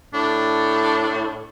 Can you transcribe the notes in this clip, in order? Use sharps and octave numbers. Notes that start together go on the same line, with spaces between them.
A2 D4